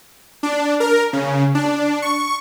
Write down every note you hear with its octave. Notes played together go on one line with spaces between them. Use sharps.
D4
A#4
C#3
D4
C#6